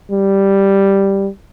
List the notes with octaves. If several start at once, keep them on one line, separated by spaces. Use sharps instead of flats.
G3